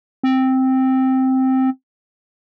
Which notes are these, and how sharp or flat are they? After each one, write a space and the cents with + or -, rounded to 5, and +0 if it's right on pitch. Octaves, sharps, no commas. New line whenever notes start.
C4 +0